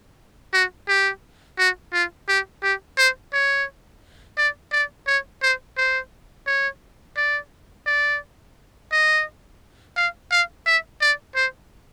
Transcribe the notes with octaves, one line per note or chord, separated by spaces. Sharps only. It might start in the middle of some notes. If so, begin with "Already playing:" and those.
F#4
G4
F#4
F4
G4
G4
C5
C#5
D5
D5
C#5
C5
C5
C#5
D5
D5
D#5
F5
F5
E5
D5
C5